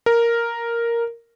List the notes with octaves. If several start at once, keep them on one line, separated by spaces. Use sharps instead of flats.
A#4